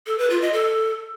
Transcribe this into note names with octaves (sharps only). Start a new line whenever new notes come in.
A4
B4
F4
D#5
A4